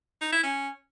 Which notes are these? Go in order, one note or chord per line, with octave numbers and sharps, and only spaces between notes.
D#4
E4
C#4